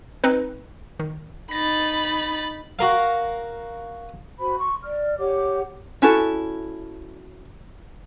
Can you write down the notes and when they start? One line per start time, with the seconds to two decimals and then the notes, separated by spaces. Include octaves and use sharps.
0.24 C4 D#4 B4
0.99 D#3
1.51 D#4 B5 A6 A#6
2.79 F#4 A#4 F5
4.39 F#4 C5 B5
4.58 C6 C#6
4.84 D5 F6
5.19 G4 C#5 F#5 D6
6.02 C#4 E4 F#4 A4